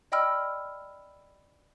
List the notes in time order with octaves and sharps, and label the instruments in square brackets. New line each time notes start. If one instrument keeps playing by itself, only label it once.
[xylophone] D5 D#5 G5 B5 E6 F6